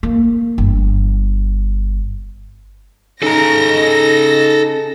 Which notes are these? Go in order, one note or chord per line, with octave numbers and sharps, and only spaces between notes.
A#3
G1
C#4 D#4 G#4 A4 A#5 A#6